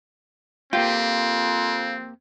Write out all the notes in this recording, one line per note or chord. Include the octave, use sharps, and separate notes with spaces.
F2 A#3 C4 F4 G4 G5